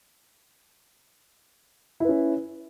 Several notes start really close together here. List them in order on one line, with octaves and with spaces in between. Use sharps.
E4 B4 C#4